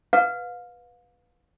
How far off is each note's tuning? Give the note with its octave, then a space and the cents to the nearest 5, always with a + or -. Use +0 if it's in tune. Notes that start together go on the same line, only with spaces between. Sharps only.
B4 +0 F5 +30